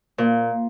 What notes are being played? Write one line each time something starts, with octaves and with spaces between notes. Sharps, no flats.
A#2